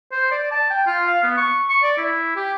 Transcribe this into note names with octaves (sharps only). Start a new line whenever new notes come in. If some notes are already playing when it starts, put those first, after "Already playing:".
C5
D5
A5
G5
F4
F5
B3
C#6
C#6
D5
E4
G4